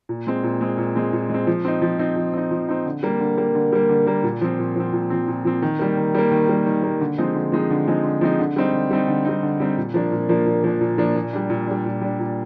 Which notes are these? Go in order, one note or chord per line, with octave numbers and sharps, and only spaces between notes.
A#2
G#3 C4
A#2
G#3 C4
A#2
G#3 C4
A#2
G#3 C4
F3
C4 D#4
F3
C4 D#4
F3
C4 D#4
F3
C4 D#4
D3
G3 A#3
D3
G3 A#3
D3
G3 A#3
D3
G3 A#3
A#2
F3 C4
A#2
F3 C4
A#2
F3 C4
A#2
F3 C4
D#3
G3 A#3
D#3
G3 A#3
D#3
G3 A#3
D#3
G3 A#3
D3
F3 G#3 C4 D#4
D3
F3 G#3 C4 D#4
D3
F3 G#3 C4 D#4
D3
F3 G#3 C4 D#4
D3
G3 C4 D#4
D3
G3 C4 D#4
D3
G3 C4 D#4
D3
G3 C4 D#4
A#2
F3 A#3 D4
A#2
F3 A#3 D4
A#2
F3 A#3 D4
A#2
F3 A#3 D4
A#2
G3 D4
A#2
G3 D4
A#2
G3 D4
A#2